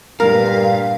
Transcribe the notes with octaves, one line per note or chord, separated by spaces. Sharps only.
G2 A#2 A#4 F5